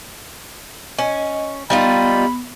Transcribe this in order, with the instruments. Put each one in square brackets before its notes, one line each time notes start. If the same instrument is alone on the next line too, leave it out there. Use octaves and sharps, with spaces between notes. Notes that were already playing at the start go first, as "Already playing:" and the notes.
[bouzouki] C#4 [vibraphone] D#5
[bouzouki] G3 D#4 F4 [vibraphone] B3 [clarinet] B5